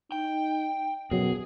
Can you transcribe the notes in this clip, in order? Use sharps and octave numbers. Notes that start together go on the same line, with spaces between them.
D#4 G5
F#2 B2 F#3 G#4